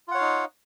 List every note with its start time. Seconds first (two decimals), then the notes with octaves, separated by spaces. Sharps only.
0.08 F4
0.11 F#5
0.15 C#5
0.18 F5
0.21 D#4